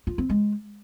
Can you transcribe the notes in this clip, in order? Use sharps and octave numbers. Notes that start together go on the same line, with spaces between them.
F4
C4
G#3